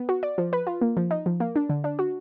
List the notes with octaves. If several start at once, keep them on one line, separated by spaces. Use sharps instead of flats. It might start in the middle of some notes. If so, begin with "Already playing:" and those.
Already playing: B3
F#4
D5
F3
B4
F4
A#3
F3
D#4
F3
A#3
D4
D3
D4
F#4